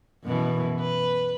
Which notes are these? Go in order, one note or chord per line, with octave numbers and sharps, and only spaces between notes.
F#2 B2 E3
B4